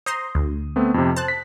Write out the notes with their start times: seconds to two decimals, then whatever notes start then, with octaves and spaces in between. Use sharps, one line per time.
0.06 C5 A#5 C6 D#6
0.35 D2
0.76 A3 B3 C4
0.94 F2 C3
1.16 C5 A5 F#6
1.28 B6